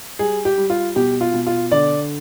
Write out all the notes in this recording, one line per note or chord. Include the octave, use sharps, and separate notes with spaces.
G3 G#4
G4
G3
F4
B2 G4
F4
B2
F4
D3 D5